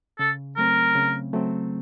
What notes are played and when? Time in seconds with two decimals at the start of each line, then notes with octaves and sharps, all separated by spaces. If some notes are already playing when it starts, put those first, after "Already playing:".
0.19 C#3 A4
0.57 F#3 A3 C4 A#4
0.95 C#3
1.33 F#3 A3 C4